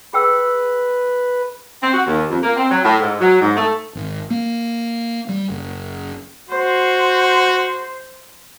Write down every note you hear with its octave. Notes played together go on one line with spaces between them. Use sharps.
G#4 B4 G5 E6
C4
F#4
D#2
F2
A#3
C4
F#3
A2
G#2
F#3
G#2
A3
G#1
A#3
G3
F#1
F#4 C5 C6